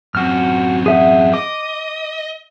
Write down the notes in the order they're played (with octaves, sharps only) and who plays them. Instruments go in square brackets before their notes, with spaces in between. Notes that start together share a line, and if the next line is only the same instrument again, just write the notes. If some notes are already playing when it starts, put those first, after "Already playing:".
[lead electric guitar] F#2 C4 [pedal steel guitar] F#4 F6
[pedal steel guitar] G#4 E5 F#5
[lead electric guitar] D#5 [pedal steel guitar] D6